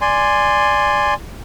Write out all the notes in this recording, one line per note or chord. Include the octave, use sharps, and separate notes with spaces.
D5 G#5 C6